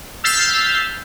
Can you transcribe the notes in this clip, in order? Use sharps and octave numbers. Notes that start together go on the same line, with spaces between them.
E6 F6 G6 A6 B6 C7